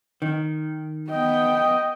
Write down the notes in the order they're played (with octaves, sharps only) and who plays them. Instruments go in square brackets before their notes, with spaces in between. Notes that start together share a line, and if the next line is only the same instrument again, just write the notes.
[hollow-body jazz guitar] D#3
[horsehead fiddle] B3 G5 [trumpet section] D#5